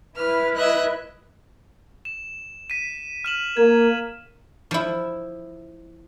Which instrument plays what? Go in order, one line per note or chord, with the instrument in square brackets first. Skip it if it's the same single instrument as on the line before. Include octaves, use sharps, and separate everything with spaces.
[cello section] E4 B4 [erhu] F6
[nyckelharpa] D#5 E5 [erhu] F#6
[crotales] E7
B6 D#7
F6 E7 F#7
[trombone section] A#3 A#4 [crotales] G#6
[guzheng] F3 E4